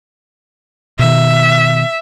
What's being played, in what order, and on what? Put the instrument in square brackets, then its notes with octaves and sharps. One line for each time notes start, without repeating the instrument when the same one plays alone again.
[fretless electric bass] B2 D#3 [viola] E5